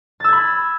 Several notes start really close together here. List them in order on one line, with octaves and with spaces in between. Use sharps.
A6 E6 G#6 B5